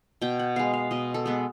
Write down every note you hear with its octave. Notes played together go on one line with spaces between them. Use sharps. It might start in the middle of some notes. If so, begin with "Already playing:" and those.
B2 G5
F#5
G#3 B3 F5
F5
B2 D#5
A4
G#3 B3 B4